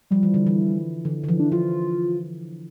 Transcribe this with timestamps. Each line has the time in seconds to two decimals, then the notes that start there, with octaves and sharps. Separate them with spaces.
0.11 F3 G3
0.23 E3
0.34 D3
0.47 E3
1.05 D3 E3
1.24 D3
1.28 E3 F3
1.40 D4
1.52 F3 F4